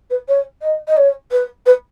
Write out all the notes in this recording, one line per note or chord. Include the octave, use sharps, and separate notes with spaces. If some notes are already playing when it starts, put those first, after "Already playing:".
B4
C#5
D#5
D#5
C#5
B4
B4